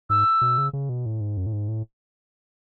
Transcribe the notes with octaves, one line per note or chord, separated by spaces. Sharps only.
G#2 E6
B2
C#3
C#3
B2
A2
G#2
F#2
A2
G#2
A2